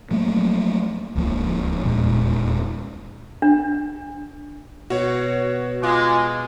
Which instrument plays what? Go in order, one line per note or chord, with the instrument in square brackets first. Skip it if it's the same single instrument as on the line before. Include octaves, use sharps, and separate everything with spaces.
[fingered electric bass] F3 F#3 A3 A#3
D1 C#2 F3 A#3
D#1 E2 A#2 G#3
[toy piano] D4
[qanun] B2 [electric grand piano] F#4 C#5
[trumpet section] G#3 [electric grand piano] F4 D6